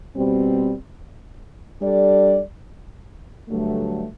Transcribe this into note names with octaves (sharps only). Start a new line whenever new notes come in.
B2 G3 C4
G3 D4 A4 D5
G2 D3 F#3 A3